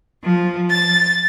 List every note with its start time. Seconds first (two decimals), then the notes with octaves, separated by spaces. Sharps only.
0.23 F3
0.69 A6